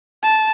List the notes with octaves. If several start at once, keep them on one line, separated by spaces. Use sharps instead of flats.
A5